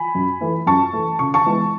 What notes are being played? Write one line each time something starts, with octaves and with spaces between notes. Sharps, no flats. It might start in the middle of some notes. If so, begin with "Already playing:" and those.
Already playing: G#5 B5
F#2
E3 A3
F#2 A5 C#6
E3 A3
C#3 C#6
A5 C#6
E3 G#3 B3